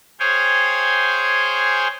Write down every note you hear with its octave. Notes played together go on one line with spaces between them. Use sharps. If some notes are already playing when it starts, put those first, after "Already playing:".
G#4 C5 C#5 F5 G5 G#5